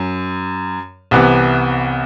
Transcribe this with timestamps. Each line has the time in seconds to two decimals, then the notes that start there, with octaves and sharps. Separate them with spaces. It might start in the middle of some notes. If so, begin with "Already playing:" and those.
Already playing: F#2
1.11 C2 C3 E3 B3